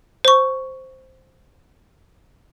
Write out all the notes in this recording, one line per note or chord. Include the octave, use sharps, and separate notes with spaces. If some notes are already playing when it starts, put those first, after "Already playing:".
C5 C#6